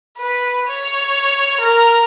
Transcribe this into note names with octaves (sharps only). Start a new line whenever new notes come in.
B4
C#5
A#4